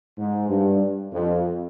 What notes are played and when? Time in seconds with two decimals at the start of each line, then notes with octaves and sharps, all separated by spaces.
0.18 G#2
0.49 G2
1.12 F2